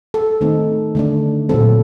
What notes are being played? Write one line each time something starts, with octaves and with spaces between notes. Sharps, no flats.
A4
D#3 A3 C4 D#4
D3 A3 D4
A#2 F#3 C4 A4